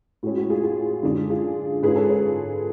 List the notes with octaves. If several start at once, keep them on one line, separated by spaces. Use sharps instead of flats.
A2 G#3 C#4 F#4
F#4
F4 G#4
F4 G#4
F#2 D3 G#3 D4
F4 G#4
G#2 G#3 C#4 F4 G#4 B4
A4 C#5
B4
A4 C#5